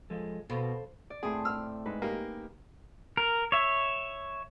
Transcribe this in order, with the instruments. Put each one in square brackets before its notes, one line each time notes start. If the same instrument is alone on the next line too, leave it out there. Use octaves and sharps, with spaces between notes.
[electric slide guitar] F3 G#3 A4
[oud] B2 [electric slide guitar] A4 C5 F5
[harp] D5
[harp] A2 C4 [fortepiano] G#4
[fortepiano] E6 F6
[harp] G#2 D#4 B4
[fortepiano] A#3 [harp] D#4 G4
[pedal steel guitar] A#4
C#5 E5